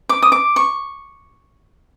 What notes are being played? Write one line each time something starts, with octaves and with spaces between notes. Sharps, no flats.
D6
D#6
D6
C#6